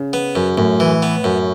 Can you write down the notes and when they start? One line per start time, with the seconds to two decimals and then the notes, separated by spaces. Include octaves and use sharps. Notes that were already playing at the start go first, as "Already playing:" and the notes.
Already playing: C#3
0.13 B3
0.36 F#2
0.58 F#2 A2
0.80 E3
1.03 B3
1.24 F#2